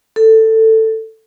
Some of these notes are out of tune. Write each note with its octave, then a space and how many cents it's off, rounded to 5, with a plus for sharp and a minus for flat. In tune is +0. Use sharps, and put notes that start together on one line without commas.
A4 +15